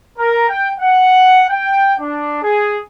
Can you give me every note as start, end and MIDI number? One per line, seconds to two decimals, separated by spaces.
0.18 0.47 70
0.49 0.71 79
0.79 1.45 78
1.50 1.95 79
2.00 2.41 62
2.43 2.78 68